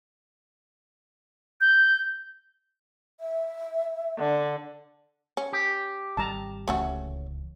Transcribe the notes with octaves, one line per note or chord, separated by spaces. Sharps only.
G6
E5
D3
C#4
G4
G#1 G3 A5 A#5
D1 C#2 E3 A3 C#4 F#4